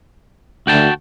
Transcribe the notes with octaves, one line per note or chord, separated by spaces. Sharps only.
D2 F#4 G5 A5